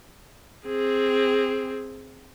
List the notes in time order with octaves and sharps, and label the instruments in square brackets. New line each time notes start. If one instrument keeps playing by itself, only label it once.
[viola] C4 G#4